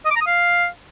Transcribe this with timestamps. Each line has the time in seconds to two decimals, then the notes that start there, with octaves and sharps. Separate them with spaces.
0.05 D#5
0.11 D6
0.16 A#5
0.21 D#6
0.26 F5